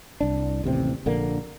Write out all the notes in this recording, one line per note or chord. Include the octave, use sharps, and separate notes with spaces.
C2 D4
A1 D#2 C3 C4
A#1 D3 A#3